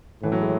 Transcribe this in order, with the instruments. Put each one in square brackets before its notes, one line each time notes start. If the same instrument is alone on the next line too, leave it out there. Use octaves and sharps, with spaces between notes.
[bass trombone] A2 [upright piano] E3
[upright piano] F#3
G#3